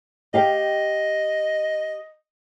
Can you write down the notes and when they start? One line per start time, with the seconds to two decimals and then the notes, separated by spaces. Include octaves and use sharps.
0.34 G4 D#5 F5 G5